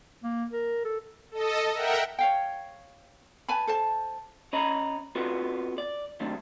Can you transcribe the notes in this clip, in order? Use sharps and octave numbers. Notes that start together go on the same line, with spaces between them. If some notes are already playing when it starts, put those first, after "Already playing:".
A#3
A#4
A4
A4 D#5
A#4 E5 F#5 G5
C#5 F5 G5
B4 G#5 A5 B5
A4 C5 A5
C#4 C#5 D#5 A#5 B5
B3 C4 F4 F#4 A4 B4
D5
D#3 F#3 A3 C4 D4